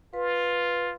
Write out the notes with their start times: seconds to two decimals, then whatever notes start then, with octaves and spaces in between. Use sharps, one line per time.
0.13 F4 B4